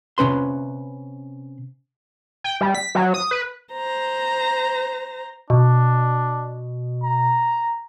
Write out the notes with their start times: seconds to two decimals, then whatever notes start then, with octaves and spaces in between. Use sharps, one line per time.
0.18 C3 C#4 B4 C6
2.44 G5
2.61 G3
2.75 B6
2.95 F#3
3.14 D#6
3.31 B4
3.73 C5 A#5
5.50 B2 D4
7.03 A#5